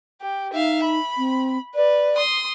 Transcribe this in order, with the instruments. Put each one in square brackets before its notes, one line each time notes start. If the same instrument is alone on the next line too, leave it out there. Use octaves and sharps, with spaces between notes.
[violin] G4
[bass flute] D#4 [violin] E5 F5
[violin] B5
[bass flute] C4
[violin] B4 [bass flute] D5
[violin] C6 D#6